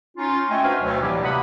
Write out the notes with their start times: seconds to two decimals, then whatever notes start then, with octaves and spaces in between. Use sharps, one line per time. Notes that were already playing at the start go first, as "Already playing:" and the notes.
0.17 C#4 D#4 F4
0.49 A3 D#5 G5 G#5
0.63 D4 F#4 B4 C5 F5
0.81 D2 B2 F#3
1.01 A2 E3 F#3 G3 A#3 G4
1.24 C3 F#5 B5 D#6